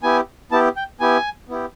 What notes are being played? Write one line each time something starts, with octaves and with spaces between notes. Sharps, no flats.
B3 E4 G4 G#5
B3 E4 G4 A5
G5
B3 E4 G4 G#5
B3 E4 G4